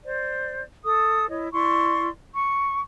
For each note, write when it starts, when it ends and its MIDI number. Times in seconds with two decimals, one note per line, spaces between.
0.04 0.62 72
0.04 0.62 74
0.84 1.27 69
0.84 1.27 87
1.28 1.48 64
1.28 1.48 73
1.28 1.48 75
1.52 2.08 64
1.52 2.08 74
1.52 2.08 84
1.52 2.08 85
2.34 2.79 85